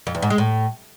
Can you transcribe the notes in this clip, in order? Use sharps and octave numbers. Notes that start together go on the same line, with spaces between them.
F2
E2
G#2
G#3
A2